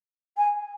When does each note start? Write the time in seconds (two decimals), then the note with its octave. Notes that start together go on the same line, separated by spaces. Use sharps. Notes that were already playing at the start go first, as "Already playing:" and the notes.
0.37 G#5